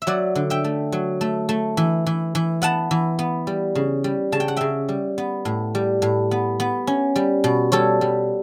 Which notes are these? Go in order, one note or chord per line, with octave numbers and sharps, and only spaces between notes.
E5
F#3 D5 F#5
D3
E5 G5
A3
F#3
A3
A3
E3
E3
E3
B3 F#5 A5
E3
B3
G3
C#3
G3
C#3 A5
G5
F#5
C#3 E5 G5
G3
B3
A2
G3
A2
B3
B3
C#4
G3
B2
G3 A4 C#5
G3